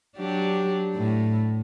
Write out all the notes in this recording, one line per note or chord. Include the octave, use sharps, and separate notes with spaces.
F#3 D4 G4
A2